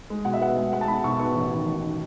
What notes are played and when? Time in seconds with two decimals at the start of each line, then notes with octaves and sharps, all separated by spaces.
0.10 G#3
0.25 B2 F#5
0.34 E5
0.41 B3 F#5
0.56 G#3
0.72 G#3 F#5
0.81 A5
0.88 B2 B5
1.04 B2 C#6
1.19 B3 C#6
1.35 A1
1.51 D#3
1.66 A1